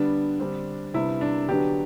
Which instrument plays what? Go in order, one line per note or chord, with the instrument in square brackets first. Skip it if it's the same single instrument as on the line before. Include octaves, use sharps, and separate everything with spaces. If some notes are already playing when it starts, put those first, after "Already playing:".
Already playing: [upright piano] D3 G3 B3 D4
D3 G3 C4
C3 G3 B3 D4 E4
D4
D3 F#3 B3 D4 G4